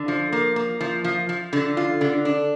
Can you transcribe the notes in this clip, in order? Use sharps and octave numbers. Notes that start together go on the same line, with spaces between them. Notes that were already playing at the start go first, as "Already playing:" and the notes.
Already playing: D3
F3
A#3
A#3
F3
F3
F3
D3
F4
D3
D4